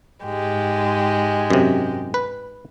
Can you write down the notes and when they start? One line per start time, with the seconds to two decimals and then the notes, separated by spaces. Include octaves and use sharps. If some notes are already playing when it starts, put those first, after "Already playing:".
0.23 G#2 G#3 G4
1.50 F#2 C3
2.14 B4